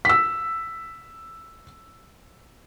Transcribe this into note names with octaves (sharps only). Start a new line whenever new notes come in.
E6 B6